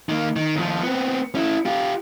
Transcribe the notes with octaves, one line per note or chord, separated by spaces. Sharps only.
D#3 A#3
D#3
D#2 F3
B3 C4
C#4 E4
F4 G4